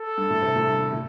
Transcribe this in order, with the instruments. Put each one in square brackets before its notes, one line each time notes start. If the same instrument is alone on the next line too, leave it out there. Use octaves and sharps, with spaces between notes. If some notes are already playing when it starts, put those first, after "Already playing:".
Already playing: [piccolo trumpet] A4
[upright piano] G2
A2
C3
A2
G2
A2
A2